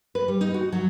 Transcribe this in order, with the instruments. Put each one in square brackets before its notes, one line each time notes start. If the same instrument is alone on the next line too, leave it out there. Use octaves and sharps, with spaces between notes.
[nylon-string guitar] B4
G3
D#4
F#4
F#3